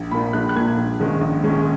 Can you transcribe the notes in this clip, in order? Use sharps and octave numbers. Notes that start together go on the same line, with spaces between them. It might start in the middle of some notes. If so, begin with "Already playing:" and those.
Already playing: A#1
A#2 A#3 B5
A#1 F#6
F#6
A#2 A#3 G#6
A#1
G#2 D#3 G#3 C#4
A#1
G#2 D#3 G#3 C#4